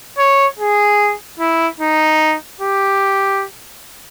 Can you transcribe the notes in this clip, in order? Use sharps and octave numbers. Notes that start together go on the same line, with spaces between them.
C#5
G#4
E4
D#4
G4